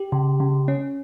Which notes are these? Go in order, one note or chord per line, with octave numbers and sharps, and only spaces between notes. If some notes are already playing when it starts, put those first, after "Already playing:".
Already playing: G4
C#3
C#3
C#4